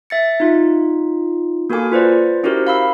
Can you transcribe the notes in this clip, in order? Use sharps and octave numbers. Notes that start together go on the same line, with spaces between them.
E5 A6 C#7
D#4 F4
A#3 F#4 A4 A#4 G#5 D6
F4 B4 C5 D5
C#4 E4 F#4 G4 A#4 C5
F5 B5 E6